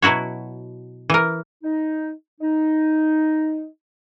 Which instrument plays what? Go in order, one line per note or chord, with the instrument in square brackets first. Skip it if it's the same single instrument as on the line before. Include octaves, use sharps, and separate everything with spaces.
[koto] B2 F#3 E4 F#4 C#5
E3 A#4
[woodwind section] D#4
D#4